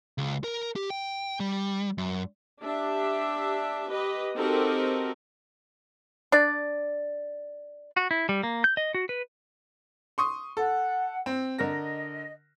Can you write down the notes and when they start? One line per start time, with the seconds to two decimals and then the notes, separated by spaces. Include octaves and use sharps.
0.18 C#2
0.44 A#4
0.76 G4
0.90 G5
1.40 G3
1.98 F#2
2.63 D4 G4 E5
3.90 G4 B4 D#5
4.36 C4 D#4 F#4 G4 A4 A#4
6.32 D4 D5
7.96 F#4
8.11 E4
8.29 G3
8.43 A#3
8.64 G6
8.77 D#5
8.94 F#4
9.09 B4
10.18 C6 C#6 D#6
10.57 A4 F#5
11.26 C4
11.58 D3 A#4 D#5 A#6